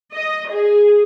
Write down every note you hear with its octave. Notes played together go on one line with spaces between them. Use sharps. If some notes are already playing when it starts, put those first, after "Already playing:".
D#5
G#4